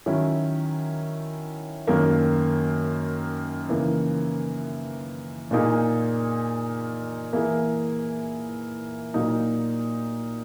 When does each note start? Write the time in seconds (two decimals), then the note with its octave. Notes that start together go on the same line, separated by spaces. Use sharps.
0.06 D#3 F#3 C#4 E4
1.87 F#2 D#3 A#3
3.69 C#3 E3 A#3 D#4
5.51 A#2 A#3 D#4 G#4
7.33 E3 A#3 E4 G#4
9.14 A#2 F#3 A#3 D#4